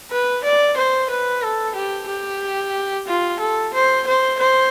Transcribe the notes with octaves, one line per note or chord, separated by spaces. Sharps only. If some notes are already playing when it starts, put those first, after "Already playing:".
B4
D5
C5
B4
A4
G4
G4
F4
A4
C5
C5
C5